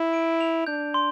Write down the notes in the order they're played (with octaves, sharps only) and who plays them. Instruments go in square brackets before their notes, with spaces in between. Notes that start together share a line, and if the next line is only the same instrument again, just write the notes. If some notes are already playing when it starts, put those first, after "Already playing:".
Already playing: [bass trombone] E4
[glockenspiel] D7
F7
[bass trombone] D4 [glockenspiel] G6
[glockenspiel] C6